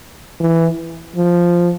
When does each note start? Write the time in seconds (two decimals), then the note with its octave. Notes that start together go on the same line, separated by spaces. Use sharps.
0.40 E3
1.16 F3